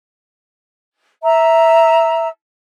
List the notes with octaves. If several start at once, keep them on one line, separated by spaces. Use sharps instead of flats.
E5 A#5 E6